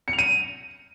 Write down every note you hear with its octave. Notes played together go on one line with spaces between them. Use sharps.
C#7
F7
D#7